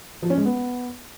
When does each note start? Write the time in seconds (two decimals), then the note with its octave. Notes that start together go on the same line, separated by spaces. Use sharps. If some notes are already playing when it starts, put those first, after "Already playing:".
0.23 F3
0.30 C#4
0.38 G#3
0.45 B3